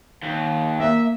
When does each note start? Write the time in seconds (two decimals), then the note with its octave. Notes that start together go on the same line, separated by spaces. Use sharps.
0.23 D#2
0.80 A#3 E5